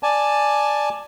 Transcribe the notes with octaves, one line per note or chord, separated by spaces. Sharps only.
D5 G#5 A5